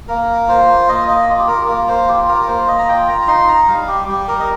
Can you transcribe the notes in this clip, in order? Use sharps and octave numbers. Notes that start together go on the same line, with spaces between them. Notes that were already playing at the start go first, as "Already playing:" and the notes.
A#3 A#4
F4 C5
A#3 D#5
D#5
F4
G4
A#4
G4
A#3 A#4
C5
F4 G4
A#4
A#3 C5
D#5
A#5
F4 G5
A#5
A#5
D#4 C6
A#5
G3 F5
G4
G3 G4
A#4
D#5